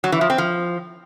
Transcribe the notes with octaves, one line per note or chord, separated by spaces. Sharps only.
F#3
E3
F3
C4
F3